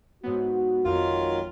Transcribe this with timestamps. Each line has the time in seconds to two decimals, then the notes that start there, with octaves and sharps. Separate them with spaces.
0.23 G#2 F#3 B3 F#4
0.84 G#1 F2 D#3 F#3 F4 A#4